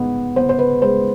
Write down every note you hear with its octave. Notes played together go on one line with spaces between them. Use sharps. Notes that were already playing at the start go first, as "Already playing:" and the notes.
Already playing: G#2 B3
B3 C5
C5
B4
G#3 C5